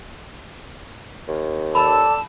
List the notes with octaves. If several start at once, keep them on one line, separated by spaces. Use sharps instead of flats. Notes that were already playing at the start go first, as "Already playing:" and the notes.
D#2
A4 D5 A5 B5